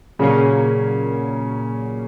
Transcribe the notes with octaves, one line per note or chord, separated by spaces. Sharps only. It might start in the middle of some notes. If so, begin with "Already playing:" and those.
A#2 C#3 F#3 A#3 C#4